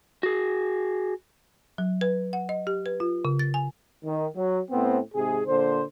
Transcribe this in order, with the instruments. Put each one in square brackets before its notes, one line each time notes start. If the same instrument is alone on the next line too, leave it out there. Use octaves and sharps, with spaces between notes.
[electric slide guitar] F#4 G#4
[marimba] F#3
B4
F#5
D#5
G4
B4
F4
C#3
A6
G#5
[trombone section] D#3
F#3
A2 B3 C4
G#2 C3 G#4
A#2 D3 C5